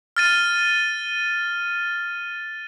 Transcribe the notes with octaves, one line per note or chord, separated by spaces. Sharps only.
F6 A6 D#7